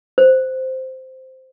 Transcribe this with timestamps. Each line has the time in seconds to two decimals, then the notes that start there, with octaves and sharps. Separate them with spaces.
0.18 C5